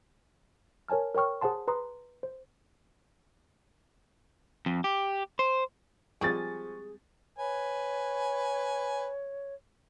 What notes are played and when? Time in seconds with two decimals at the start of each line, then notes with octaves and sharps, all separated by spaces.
0.88 A#4 C#5 G#5 A5 F6
1.15 A#4 C#5 G5 C#6 F6
1.41 G#4 C5 F#5 A5 C6
1.68 B4 A#5 C6 D#6
2.23 C5
4.66 F2
4.84 G4
5.39 C5
6.21 F3 G3 G#3 C4 G#4 G#5 C#6 A6
7.38 B4 C#5 G#5